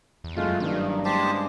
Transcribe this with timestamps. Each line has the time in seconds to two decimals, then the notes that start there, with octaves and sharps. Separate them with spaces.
0.24 E2
0.36 F#1 F#2 G#3 A3 F4
0.60 F#1 G2 D#3
1.05 G#3 G4 C5 A5